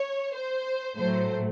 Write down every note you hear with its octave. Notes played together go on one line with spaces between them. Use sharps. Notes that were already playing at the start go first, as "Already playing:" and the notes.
Already playing: C#5
C5
A2 F#3 A3 C5